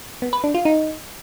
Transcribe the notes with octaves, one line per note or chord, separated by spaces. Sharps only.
B3
B4
D4
F4
D#4